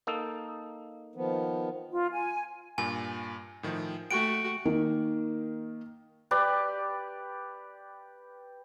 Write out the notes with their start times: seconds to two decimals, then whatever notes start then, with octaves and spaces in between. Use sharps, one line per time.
0.07 A#3 D#4 A4
1.15 D#3 F3 B3
1.91 F4
2.12 G#5
2.78 G2 A#2 G#5
3.63 A2 D#3 F3
4.11 A3 F#4 F#5 G5 C#6 D7
4.65 D#3 A#3 D#4
6.31 G4 B4 D5